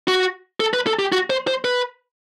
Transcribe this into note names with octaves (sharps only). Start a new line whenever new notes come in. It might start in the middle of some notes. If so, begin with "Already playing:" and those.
F#4
A4
B4
A4
G4
F#4
C5
C5
B4